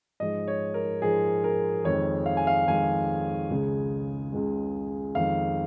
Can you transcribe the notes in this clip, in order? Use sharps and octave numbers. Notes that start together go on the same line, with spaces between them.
G#2 F3 G#3 D#5
C#5
A#4
G#2 F3 G#3 G#4
A#4
F2 D#3 G#3 C#5
F5
G#5
F5
F2 D#3 G#3 G#5
C#2 C#3 G#3
C#2 C#3 G#3
F2 D#3 G#3 F5